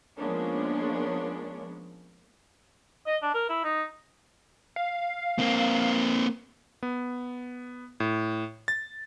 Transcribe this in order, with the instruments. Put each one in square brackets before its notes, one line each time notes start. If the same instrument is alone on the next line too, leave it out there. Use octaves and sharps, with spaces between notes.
[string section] F3 G#3 A#3 B3 C#4 D4
[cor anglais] D#5
D4
A#4
E4
D#4
[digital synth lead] F5
[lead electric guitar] A#3 C4
[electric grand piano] B3
A2
A6